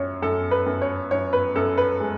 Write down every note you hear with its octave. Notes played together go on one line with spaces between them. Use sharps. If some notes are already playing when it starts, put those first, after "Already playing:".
Already playing: F#2 C#5
F#2 A4
B4
F#2
C#5
F#2 C#5
B4
F#2 A4
B4
G#3